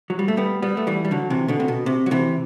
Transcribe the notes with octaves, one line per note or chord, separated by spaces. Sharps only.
F#3
G3
A3
G3 B3
G3 B3
A3
E3 G3
G3
D3 F#3
C3 E3
B2 D3
C3
B2
C3
F#3
C3 E3